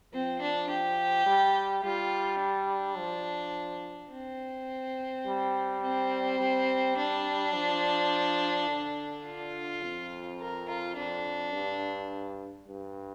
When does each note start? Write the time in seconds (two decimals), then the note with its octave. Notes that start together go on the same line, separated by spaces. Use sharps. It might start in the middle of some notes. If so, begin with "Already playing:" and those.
0.13 F3 C4
0.42 D4
0.70 G4
1.26 G3
1.84 G3 F4
2.41 D4
2.98 F3
4.12 C4
5.27 G3
5.83 C4
6.40 G3
6.97 D4
7.55 F3
8.68 D3
9.25 F4
9.83 F2
10.40 A#4
10.68 F4
10.96 F2 D4
11.54 G2
12.67 G2